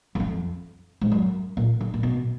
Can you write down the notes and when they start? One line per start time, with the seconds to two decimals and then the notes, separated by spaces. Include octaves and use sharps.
0.15 F#2
0.20 F2
1.01 G#2
1.11 F#2
1.57 A#2
1.81 D3
1.94 A#2
2.03 B2